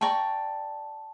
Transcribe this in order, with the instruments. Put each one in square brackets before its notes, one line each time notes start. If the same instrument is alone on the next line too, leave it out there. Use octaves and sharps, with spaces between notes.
[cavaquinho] D5 G5 A#5 C#6 [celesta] A5